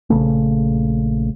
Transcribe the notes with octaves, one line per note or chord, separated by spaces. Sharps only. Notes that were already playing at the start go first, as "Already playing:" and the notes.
A#1 C#3 A3